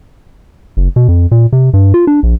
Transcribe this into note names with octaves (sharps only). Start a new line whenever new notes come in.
F#1
B2
F2
A#2
C3
G2
F4
D4
A#1